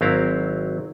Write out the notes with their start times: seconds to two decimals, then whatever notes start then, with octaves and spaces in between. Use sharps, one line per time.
0.01 G#1 F#3 C4 E4 F5 A#5